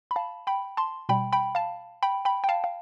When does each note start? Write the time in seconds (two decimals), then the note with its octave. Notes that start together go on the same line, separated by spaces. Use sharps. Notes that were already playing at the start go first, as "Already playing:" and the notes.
0.11 B5
0.16 F5 A5
0.47 G5 B5
0.77 A5 C6
1.09 B2 G3 G5 B5
1.33 G5 B5
1.55 F5 A5
2.03 G5 B5
2.25 G5 B5
2.44 G5
2.49 F5 A5
2.64 F5